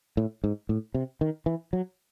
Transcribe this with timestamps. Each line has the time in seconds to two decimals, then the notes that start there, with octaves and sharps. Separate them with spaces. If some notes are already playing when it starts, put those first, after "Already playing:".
0.17 A2
0.44 G#2
0.69 A2
0.94 C3
1.21 D#3
1.46 E3
1.73 F#3